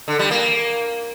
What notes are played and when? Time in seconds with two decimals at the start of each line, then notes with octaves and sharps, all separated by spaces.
0.08 D3
0.19 G3
0.31 A#3